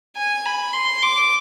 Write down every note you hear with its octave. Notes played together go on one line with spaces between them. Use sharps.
G#5
B5
C6
D6